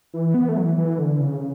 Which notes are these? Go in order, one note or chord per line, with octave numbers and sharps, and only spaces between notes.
E3
B3
A3
F#3
E3
E3
D3
C#3